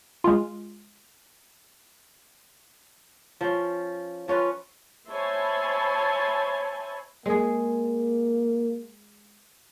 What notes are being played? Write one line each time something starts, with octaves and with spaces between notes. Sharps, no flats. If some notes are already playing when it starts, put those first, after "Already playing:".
G#3 F4
F3 C#4
F3 C#4 F4 B4
C5 C#5 E5 G#5 A5 B5
G#3 A#3 G#4